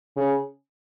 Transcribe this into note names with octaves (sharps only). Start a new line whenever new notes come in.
C#3